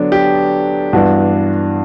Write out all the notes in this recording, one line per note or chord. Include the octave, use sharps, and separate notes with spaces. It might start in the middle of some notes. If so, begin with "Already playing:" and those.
Already playing: D3 F#3 B3 D4
G4
G2 E3 B3 D4 F#4